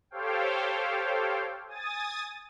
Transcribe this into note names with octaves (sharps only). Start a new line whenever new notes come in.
G4 A4 C5 C#5 F5 G5
G#5 D#6 A6